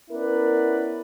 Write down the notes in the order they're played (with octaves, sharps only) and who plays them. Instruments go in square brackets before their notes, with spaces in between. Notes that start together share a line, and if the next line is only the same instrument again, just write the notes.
[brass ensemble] B3 C#4 E4 A#4 B4 D5